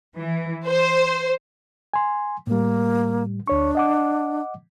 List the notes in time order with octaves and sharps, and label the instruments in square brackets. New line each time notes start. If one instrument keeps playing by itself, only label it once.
[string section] E3
C5
[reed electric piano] G#5 C6
[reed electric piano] A2 G3 [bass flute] A#3
[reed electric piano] D2 C#5 C#6 [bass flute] D4
[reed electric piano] D#5 F#5 D6